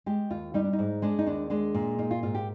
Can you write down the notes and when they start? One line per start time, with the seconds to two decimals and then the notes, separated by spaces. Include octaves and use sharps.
0.06 G#3 G4
0.30 D#2 F4
0.54 G3 D#4
0.64 D4
0.73 D#4
0.79 G#2
1.02 G#3 D4
1.19 D#4
1.26 D#2 D4
1.50 G#3 D4
1.75 A#2
1.99 A#3 D#4
2.11 F4
2.23 G#2 F4
2.35 G4